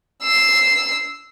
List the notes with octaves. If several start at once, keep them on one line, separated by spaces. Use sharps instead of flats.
E6 C7